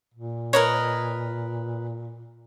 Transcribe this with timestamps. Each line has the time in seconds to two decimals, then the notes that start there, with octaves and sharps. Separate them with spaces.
0.14 A#2
0.53 A#4 B4 C#5 D#5